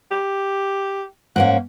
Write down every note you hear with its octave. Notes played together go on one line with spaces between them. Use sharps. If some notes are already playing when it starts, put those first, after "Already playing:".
G4
G#2 A#3 C#4 F#5